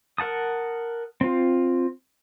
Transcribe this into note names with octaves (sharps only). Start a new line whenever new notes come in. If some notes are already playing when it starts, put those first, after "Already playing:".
A#4 F#5 A5 D#6
C4 F4